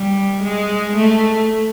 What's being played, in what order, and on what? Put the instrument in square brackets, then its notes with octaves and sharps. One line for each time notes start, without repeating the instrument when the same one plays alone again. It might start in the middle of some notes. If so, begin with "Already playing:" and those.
Already playing: [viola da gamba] G3
G#3
A3